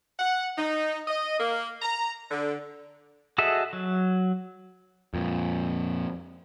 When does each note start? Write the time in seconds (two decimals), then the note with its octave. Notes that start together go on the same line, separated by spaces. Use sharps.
0.19 F#5
0.58 D#4
1.08 D#5
1.40 A#3
1.82 A#5
2.30 D3
3.38 F#4 G#4 A4 D#5 E5
3.73 F#3
5.14 F2 A#2